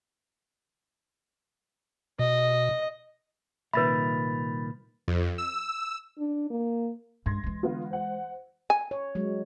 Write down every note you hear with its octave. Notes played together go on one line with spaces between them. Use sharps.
B2 D#5
C2 A#2 D#3 B4 E5 B5 A6
F2
E6
D4
A#3
G2 G#3 C6 G#6 A#6
E3 G#3
D3 B3 F4
C5 F#5
G#5
C#5
F#3 G#3